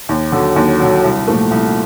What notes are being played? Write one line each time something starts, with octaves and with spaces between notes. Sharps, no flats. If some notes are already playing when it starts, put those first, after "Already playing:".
D#2
D3 F#3
D#2
D3 F#3
C2
A#2 F3 A3
C2